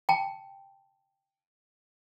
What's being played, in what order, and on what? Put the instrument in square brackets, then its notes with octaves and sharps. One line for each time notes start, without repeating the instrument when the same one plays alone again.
[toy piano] G5 A5